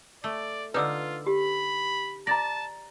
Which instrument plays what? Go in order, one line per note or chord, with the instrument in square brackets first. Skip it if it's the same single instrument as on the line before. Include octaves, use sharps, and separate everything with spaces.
[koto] A3 [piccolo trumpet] D5
[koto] D3 D#4 [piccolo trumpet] F4 [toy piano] B4 D6 E6
[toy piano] G4 [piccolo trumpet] B5
[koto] D5 [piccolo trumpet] A5 [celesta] A#5 A6 A#6